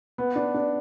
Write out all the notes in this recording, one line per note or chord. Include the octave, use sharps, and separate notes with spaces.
B3
D4
D4